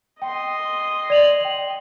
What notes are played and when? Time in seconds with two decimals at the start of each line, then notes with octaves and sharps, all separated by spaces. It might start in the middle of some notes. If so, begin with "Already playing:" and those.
0.22 D#5 G5 C6
1.10 D5 F7 F#7
1.41 G5 F#7